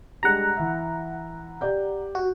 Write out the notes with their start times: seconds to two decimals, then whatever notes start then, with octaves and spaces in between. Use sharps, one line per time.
0.23 G3 G#3 D4 F#5 A#5
0.57 E3 E5
1.61 G4 D5 G6
2.15 F#4